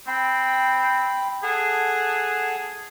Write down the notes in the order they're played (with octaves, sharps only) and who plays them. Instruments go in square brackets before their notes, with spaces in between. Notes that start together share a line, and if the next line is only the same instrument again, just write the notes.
[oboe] C4 [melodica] G5 B5
[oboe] G#4 [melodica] A4 F#5 A5